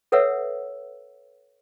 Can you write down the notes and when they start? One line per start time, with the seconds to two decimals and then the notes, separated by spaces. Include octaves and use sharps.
0.12 A4 B4 C#5 E5 F#5 E6